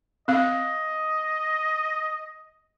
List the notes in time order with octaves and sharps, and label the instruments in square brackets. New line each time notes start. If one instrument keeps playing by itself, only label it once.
[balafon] C4 F5 [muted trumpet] D#5